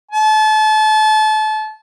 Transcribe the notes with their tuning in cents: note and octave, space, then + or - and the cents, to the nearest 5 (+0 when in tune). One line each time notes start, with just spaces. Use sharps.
A5 -30